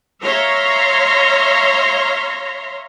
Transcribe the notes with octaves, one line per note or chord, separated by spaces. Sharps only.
C#5 E5 F5 A#5 C6